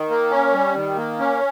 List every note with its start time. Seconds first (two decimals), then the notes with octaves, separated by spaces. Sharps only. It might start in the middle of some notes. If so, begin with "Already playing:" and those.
Already playing: D#3
0.10 A#3
0.31 C#4
0.53 G3
0.75 D#3
0.96 A#3
1.19 C#4